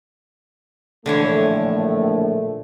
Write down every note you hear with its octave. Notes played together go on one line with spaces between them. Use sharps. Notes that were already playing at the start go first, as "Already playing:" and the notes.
A#1 A2 D3 E3 A3 C#5